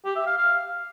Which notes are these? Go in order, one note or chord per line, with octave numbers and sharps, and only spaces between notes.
G4
E5
F5
F5